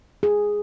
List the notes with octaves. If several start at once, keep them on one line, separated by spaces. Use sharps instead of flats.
G#4